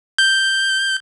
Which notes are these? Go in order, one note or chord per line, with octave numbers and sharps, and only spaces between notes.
G6